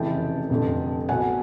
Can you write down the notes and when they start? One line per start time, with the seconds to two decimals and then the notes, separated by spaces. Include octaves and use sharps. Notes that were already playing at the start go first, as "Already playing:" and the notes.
Already playing: F1 F2 C#3 E3 G5 A5
0.50 F1 F2 D3
1.09 B1 B2 F#5 G#5